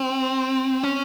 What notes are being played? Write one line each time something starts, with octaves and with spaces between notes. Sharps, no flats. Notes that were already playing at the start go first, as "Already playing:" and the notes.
Already playing: C4
C#4